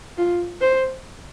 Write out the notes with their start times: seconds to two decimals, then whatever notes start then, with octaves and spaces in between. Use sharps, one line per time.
0.18 F4
0.61 C5